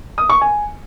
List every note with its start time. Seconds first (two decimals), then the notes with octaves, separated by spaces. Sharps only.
0.18 D#6
0.30 C#6
0.41 G#5